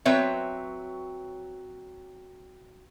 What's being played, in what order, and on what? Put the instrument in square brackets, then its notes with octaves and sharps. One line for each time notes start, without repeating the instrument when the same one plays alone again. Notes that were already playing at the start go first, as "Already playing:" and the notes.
[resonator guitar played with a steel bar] F#3 C4 F#4 B4 C#5 E5